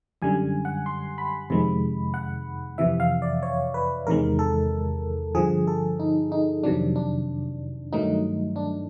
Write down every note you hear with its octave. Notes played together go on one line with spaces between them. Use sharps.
F#2 D3 G3 G#5
F#5
C6
B5
F2 C3 D#3 G#3
F#5
F2 C3 E3 E5
F5
D5
C#5
B4
E2 C3 D#3 G#3 A#4
A4
G2 D3 F3 G#4
A4
D#4
D#4
F2 C3 D#3 F#3 D4
D4
G2 D#3 F#3 A3 D#4
D4